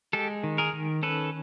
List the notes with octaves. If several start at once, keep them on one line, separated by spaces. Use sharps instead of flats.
G#3 G4 A4
D#3
G#4 A#4
D#3
C#4 A4 B4